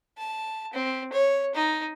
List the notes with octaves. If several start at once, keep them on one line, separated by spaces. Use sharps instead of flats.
A5
C4
C#5
D#4